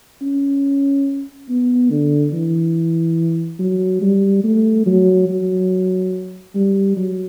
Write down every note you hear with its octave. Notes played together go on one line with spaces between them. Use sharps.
C#4
B3
D3
E3
F#3
G3
A3
F#3
F#3
G3
F#3